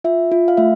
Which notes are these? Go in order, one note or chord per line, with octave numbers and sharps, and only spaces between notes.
F4 E5
F4
F5
A3 E5